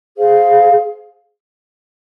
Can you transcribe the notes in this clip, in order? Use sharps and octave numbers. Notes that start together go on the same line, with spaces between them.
G#4 C5 F5